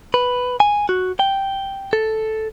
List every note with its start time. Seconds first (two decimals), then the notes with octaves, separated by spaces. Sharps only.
0.14 B4
0.60 G#5
0.89 F#4
1.19 G5
1.93 A4